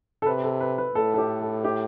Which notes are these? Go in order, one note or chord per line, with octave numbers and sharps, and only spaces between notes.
A4
C3 B4
A4
B4
B4
A2 A4
A4
G4
A4
G4